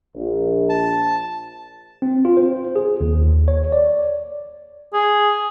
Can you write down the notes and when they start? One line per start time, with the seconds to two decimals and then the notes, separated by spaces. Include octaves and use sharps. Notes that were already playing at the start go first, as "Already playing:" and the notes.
0.15 A#1
0.70 A5
2.02 C4
2.25 F4
2.37 C5
2.76 G#4
3.00 D#2
3.48 C#5
3.72 D5
4.93 G#4